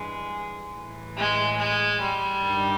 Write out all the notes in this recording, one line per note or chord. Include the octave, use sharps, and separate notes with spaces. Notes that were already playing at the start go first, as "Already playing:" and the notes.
Already playing: G2 E3 G#3
A2 E3
G#3
G#3
G3
G2 D#3